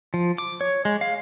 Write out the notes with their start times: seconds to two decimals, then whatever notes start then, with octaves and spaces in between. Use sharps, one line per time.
0.14 F3
0.38 D6
0.61 C#5
0.85 G#3
1.01 F5